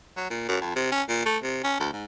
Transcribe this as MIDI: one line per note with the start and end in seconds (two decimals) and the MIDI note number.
0.17 0.29 54
0.30 0.44 46
0.48 0.58 42
0.61 0.72 41
0.75 0.91 48
0.92 1.02 61
1.09 1.24 46
1.26 1.38 57
1.43 1.60 48
1.64 1.76 61
1.80 1.89 38
1.93 2.05 44